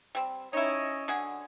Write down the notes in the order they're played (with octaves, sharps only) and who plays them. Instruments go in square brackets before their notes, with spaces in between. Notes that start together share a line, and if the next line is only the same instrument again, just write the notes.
[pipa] G3 C4
[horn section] C#4 C#5 D#5 [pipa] D#4 E4
[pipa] D3 F#4 G#4